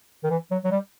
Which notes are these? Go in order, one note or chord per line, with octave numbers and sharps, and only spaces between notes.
D#3
E3
F#3
F#3
G3